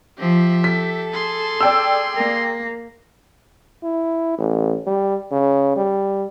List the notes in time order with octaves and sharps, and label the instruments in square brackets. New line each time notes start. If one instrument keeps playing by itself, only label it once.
[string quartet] F3 [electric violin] G4 E5
[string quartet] A4 [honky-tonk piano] B6
[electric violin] G#4 C6
[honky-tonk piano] D5 G5 E6
[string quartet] A#3
[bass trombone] E4
A1
G3
C#3
G3